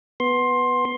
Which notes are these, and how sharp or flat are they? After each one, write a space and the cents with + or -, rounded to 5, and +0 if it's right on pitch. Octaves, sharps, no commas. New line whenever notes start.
B3 +0 C6 +15